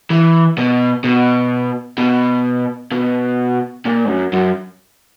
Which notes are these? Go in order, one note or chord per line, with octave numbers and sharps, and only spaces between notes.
E3
B2
B2
B2
B2
A#2
G#2
F#2
F#2